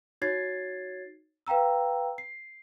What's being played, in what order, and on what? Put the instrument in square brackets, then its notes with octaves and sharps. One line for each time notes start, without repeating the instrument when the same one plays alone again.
[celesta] D#4 F#4 C#5 G#6 A6 C7
B4 F5 G5 A#5 E6
C7